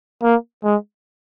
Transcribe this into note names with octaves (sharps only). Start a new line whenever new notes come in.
A#3
G#3